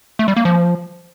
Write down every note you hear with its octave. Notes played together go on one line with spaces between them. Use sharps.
A3
G3
A#3
F3